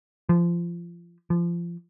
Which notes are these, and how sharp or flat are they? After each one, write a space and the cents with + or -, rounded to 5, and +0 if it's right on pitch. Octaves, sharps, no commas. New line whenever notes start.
F3 -25
F3 -25